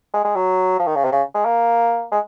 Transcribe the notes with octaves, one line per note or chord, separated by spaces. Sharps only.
G#3
G#3
F#3
F3
D#3
C#3
C3
C#3
G#3
A#3
G#3